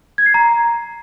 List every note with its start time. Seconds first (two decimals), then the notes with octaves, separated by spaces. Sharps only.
0.18 G#6
0.26 C7
0.34 A#5